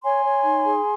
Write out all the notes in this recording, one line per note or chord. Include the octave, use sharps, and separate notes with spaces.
C#5 G#5 C6
C#5
D#4
G#4